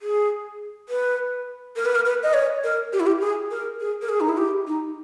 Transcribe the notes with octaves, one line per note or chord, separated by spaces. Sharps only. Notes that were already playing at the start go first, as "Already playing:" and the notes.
G#4
B4
A#4
B4
A#4
B4
D#5
C#5
A#4
G4
E4
G4
G#4
A#4
G#4
A#4
G#4
D#4
E4
G4
D#4